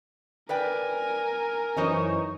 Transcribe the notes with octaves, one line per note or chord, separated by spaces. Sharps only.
A#4 B4 D5 G5 G#5
F#2 E3 D#4 C5 C#5 D#5